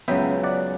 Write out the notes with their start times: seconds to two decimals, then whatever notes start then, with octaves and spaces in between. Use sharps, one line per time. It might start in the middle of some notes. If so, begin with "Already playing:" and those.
0.08 C#2 C#3 F#3 B3 E5 G5
0.44 D5 F#5